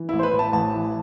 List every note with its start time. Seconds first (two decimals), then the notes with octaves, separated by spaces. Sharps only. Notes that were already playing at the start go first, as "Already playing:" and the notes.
Already playing: E3
0.09 A1 E4
0.19 C5
0.23 B4
0.33 A2
0.39 A5
0.53 A1 A5
0.74 E3